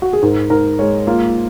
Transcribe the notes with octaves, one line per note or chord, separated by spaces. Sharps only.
F#4
G#4
G#2 A#4
G#2 A#4
G#3 C#5
A#3 F4